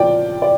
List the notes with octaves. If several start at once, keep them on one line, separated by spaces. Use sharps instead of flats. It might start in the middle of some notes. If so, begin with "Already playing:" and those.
Already playing: A#2 F3 D5 G5
D5